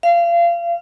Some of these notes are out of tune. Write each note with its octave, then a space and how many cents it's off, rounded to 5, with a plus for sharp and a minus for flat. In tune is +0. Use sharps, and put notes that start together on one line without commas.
F5 -30